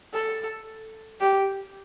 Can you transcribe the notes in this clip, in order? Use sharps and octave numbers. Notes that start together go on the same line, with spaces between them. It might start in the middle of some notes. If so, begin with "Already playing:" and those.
A4
G4